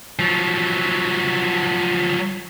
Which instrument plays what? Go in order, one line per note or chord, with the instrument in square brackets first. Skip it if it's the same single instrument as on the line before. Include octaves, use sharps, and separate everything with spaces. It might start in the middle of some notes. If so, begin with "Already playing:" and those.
[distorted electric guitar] F3 F#3